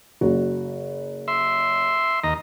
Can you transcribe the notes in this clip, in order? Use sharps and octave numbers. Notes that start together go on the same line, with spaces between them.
F#1 F#4
E5 C6
D#2 D#5 A#5